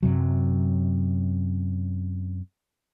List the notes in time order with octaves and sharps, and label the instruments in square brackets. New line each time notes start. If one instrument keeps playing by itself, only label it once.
[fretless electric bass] F#2 C3 F#3